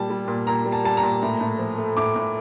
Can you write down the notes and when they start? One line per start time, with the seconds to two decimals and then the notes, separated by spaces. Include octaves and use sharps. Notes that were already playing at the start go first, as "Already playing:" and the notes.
Already playing: A#2 G3 A5
0.10 G3
0.28 A#2
0.47 A#2 A#5
0.65 G3
0.72 A5
0.84 G3 A5
0.97 A#5
1.03 A#2
1.22 A2
1.41 A2
1.59 F3
1.78 A3
1.97 A2 D6
2.16 A2